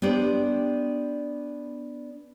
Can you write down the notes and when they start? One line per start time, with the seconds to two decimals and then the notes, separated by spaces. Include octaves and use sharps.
0.02 B3 D4 G4 C5 D5